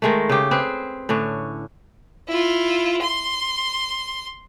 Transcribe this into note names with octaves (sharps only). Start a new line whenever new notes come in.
D#3 G#3 A3
C#3 G4
C4 G#4 B4
A2 D3 C#4
E4 F4
C6